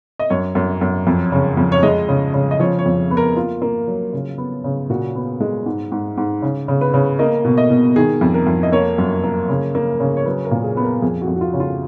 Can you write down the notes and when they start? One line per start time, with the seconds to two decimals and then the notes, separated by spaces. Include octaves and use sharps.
0.19 D#5
0.30 F#2 C#5
0.55 F#2
0.81 F#2
1.07 F2
1.32 C#3
1.57 F2
1.72 C#5
1.83 G#3 D#5
2.09 C#3
2.34 C#3
2.51 D#5
2.60 F3 C#5
2.79 C#5
2.86 F2
3.11 B3
3.17 A#4
3.36 A#3 F4
3.62 A#3
3.87 F#3
4.13 C#3
4.38 B3
4.64 C#3
4.90 A#2 F#4
5.16 B3
5.40 G#3
5.66 G#2
5.92 G#2
6.17 G#2
6.42 C#3
6.68 C#3
6.81 B4
6.94 C#3
7.19 A#3 D#5
7.45 B2
7.58 D#5
7.70 B2
7.96 D#3 G#4
8.21 F2
8.34 A#4
8.47 F2
8.63 D#5
8.72 A#3 C#5
8.98 F#2
9.24 A#3
9.49 C#3
9.75 A#3
10.00 C#3
10.17 C#5
10.26 F#3 B4
10.45 A#4
10.51 A#2
10.64 G#4
10.77 B3
10.84 A#4
11.02 F2 G#4
11.22 F#4
11.28 F2
11.36 F#4
11.41 F4
11.53 C#3
11.60 F4